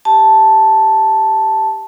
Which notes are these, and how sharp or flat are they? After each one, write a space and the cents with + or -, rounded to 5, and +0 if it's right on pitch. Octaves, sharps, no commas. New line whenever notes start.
G4 +0 A5 +0